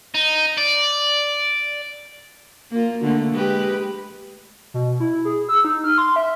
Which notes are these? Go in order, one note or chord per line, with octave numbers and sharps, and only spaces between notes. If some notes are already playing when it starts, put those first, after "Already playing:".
D#4
D5
A#3 F4
D3 A3 A#3
G#3 G4 B4
B2
E4
G#4
E6
D#4
F6
C6
E5